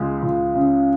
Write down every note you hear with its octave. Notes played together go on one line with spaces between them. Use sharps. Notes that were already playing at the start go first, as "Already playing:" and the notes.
Already playing: C#2 G#3
C#2
C#3